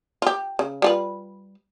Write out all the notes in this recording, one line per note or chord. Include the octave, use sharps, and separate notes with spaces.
F4 G4
C#3
G3 F4 B4